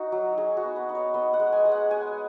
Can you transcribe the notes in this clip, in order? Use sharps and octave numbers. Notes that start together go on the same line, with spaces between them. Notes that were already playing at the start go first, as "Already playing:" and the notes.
Already playing: D#4 F#4
F#3
D#4 G#4
F#4
B3
B4
D#4
C#5
B3 D#5
F#5
G#3
G#5
G#3
F#5
G#3 G#5